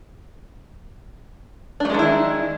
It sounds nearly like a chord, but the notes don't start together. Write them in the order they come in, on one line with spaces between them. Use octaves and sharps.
D4 A3 G#3 D#3 E4